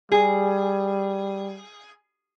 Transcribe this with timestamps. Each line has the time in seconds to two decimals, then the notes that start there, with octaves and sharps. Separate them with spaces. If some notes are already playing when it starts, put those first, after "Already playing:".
0.12 G3 G#4